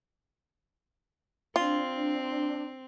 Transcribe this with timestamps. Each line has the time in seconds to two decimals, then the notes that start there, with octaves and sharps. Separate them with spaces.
1.56 C4 D4 F4